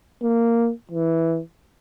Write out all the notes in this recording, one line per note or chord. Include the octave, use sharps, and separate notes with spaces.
A#3
E3